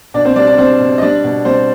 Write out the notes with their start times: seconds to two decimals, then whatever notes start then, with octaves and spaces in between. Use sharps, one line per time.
0.14 B2 D4 D5
0.25 C4 C5
0.36 G3 D4 D5
0.47 D4 D5
0.58 G3 C4 C5
0.80 B2
0.98 D#5
1.02 G3 D4 D5
1.24 B2
1.45 G3 C4 C5